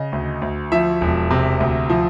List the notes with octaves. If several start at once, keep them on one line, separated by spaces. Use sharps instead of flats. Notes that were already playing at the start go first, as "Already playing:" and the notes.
Already playing: C#3 D#5
D2
D2
F3 E5
E1
C3
D2
F3